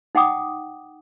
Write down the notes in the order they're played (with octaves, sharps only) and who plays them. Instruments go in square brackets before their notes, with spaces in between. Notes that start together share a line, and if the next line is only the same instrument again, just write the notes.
[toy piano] D#4 F#5 G5 D6 D#6